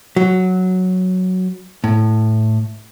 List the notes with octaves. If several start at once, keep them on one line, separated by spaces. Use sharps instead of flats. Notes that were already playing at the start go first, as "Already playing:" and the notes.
F#3
A2